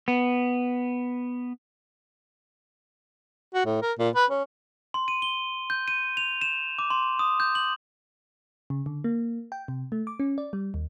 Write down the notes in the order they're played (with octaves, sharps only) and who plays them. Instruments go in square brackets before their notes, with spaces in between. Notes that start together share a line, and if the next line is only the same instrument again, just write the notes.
[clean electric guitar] B3
[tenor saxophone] F#4
A2
A#4
A#2
B4
C#4
[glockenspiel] C6
D#7
G7
G6
D#7
F7
E7
D6
C6
D#6
G6
F#7
[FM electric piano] C#3
D3
A#3
G5
C3
A3
D6
C#4
D5
G3
D#2